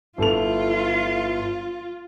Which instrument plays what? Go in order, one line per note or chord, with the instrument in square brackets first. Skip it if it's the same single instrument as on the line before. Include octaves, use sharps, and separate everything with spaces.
[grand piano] G1 A4 F7 [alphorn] E4 [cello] F4